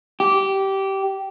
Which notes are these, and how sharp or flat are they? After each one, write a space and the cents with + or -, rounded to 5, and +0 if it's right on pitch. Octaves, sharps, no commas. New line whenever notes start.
G4 -15